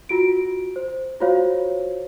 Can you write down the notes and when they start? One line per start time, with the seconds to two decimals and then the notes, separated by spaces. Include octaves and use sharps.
0.09 F4 F#4 D7
0.76 C5
1.21 F4 F#4 C5 C#5 F5